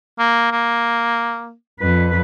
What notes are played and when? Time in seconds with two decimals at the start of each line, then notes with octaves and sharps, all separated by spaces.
0.19 A#3
0.52 A#3
1.80 F2 B4